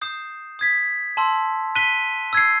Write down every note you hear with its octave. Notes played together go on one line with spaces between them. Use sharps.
D#6 G6 C7 E7
D#6 G#6 B6
A5 C6 E6
F#6 B6 D#7 G7
E6 G#6 C7